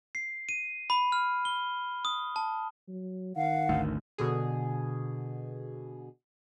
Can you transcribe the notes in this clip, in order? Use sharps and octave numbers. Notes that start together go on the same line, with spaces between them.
C7
D#7
B5
F6
G7
D#6
A5
F#3
D#3 F5 F#5
G#1 D2 A3
B2 D3 G#4